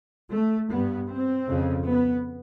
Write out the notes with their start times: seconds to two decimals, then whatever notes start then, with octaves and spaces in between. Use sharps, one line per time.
0.31 A3
0.70 G2 B3
1.09 C4
1.47 F2 C#3
1.86 B3